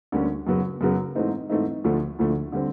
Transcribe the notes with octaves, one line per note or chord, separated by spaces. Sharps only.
D2 D3 G3 A#3 C#4
F#2 C#3 F#3 B3
F#2 C#3 F#3 B3
G#2 E3 A3 C4 D#4
G#2 E3 A3 C4 D#4
D2 D3 F3 A3
D2 D3 F3 A3
D3 G3 C4